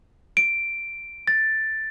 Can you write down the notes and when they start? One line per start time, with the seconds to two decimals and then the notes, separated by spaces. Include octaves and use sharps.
0.37 D7
1.28 A6